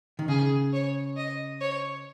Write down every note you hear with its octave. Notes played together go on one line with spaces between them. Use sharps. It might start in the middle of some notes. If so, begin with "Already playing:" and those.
D#3
C#3 G#4
C#5
D#5
C#5